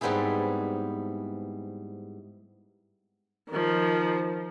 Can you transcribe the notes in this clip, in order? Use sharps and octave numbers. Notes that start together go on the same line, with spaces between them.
G#2 G3 B3 C4 E4 G#4
D#3 F3